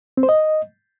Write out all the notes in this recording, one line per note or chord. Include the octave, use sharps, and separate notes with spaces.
C4
C5
D#5